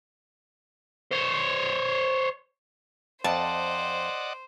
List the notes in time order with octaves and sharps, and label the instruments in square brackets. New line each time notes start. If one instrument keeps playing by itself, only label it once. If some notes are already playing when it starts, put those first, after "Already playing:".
[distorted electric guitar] C5 C#5
[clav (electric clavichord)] F2 [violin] C5 [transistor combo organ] D5 D#5 F#5 [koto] A5